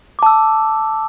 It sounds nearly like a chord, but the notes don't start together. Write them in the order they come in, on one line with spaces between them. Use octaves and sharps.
D6 A5 E6